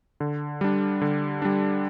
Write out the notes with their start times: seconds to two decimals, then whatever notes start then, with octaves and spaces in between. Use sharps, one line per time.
0.20 D3
0.61 G3 D4
1.02 D3
1.42 G3 D4